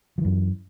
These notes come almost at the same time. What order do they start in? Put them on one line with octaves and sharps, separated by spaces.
F3 E3 F#2